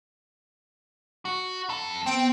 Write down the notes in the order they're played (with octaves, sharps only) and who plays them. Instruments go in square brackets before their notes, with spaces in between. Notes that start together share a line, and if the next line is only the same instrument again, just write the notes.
[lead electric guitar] F#4
F2 A4
[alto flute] B3 [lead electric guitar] C4 [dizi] G5